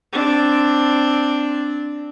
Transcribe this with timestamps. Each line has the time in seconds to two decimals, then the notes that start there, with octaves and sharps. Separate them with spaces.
0.13 C4 D4